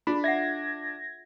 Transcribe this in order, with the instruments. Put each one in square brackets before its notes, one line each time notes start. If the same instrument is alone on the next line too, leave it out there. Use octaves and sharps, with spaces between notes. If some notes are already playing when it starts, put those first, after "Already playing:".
[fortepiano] D4 [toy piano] F4 G#4 [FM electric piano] B5
[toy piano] E5 F#5 [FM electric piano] G#6 A#6